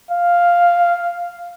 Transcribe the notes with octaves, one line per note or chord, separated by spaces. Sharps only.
F5